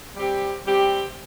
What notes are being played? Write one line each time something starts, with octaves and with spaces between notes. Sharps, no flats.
G3 C4 G4
G3 C4 G4